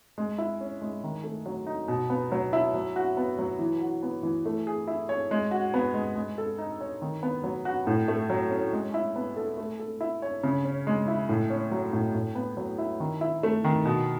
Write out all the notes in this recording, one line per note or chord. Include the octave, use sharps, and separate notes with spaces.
G#3
E4
C#4
G#3
D#3
A3
F#3
D#4
B2
B3
F#3
E4
F#3
F#4
B3
F#3
E3
F#4
B3
E3
A3
G#4
E4
C#5
G#3
F#4
B3
G#3
G#3
A4
D#4
C#5
D#3
B3
F#3
F#4
A2
A3
F#3
C#4
G#3
E4
B3
A4
A3
A4
E4
C#5
C#3
C#4
G#3
E4
A2
C#4
F#3
A2
A2
B3
F#3
E4
D#3
E4
A3
D#3
B2